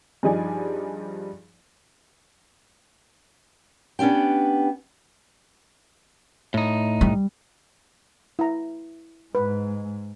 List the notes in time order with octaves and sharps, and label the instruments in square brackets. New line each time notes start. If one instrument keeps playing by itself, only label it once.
[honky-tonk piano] G2 F3 D#4 G#4 D5 G#5
[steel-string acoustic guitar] B3 C#4 D4 G4 G5
[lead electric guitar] A2 D#4
[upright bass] G3
[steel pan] E4 A#5
[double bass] G#2 G#3 [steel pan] B4